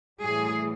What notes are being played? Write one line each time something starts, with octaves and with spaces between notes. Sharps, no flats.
A2 E3 G3 G#4